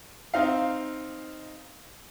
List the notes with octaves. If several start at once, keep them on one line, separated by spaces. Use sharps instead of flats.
C4 D#4 F5